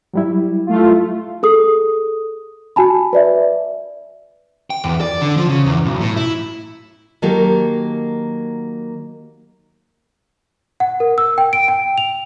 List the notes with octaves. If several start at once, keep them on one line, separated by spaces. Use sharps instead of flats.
F#3 G3 E4
A3 F4
G#4 A4 D#6
F#4 G#5 A5 B5
B4 D5 E5
G5
E2
D5
D3
F3
C#3
E2
B1
A2
E4
D#3 F#3 A#3 F#4 G4 A4
F#5
A#4
E6
G5
D7
G5
F7